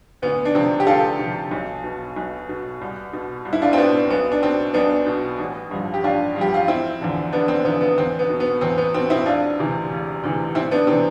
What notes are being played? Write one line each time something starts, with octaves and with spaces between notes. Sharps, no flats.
D2 B3
D4
C3 F3 C4
G4
D2 F4 A4
C3 F3
B1
B2
B1
B2
C2
B2
C2
E4
D4 F4
C4
B2 B3 D4
B1 B3
D4
B2 C4
B1 B3 D4
B2
A1
G2 F3
G4
A1 D4 F4
G2 F3 G4
F4
E1 C4 E4
E2 D3 F3
E1 B3 D4
C4
E2 D3 F3 B3
B3
E2 C4
B3
B2
B3
E2 C4
B3
B2 C4
C4 E4
E1 D4 F4
D2 C3 E3
E1
D2 C3 E3
D2 C4 E4
B3 D4
C3 E3 C4